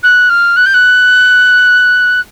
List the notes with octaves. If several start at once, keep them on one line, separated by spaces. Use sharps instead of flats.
F#6
F6
F#6
G6
F#6